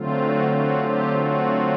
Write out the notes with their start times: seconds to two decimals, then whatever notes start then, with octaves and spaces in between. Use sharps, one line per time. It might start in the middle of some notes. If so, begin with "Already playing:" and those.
Already playing: D3 F#3 A3 C4 F4
0.17 F#4
0.49 F#4
0.80 G4
1.12 F#4